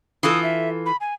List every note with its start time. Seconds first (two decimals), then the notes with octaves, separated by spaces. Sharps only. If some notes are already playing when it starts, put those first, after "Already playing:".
0.23 E3 F4 A4 D#6
0.43 E5
0.86 B5
1.00 G#5